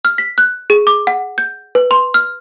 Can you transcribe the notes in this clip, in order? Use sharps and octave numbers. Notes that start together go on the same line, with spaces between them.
F6
B6
F#6
G#4
D6
F#5
G6
B4
C6
F6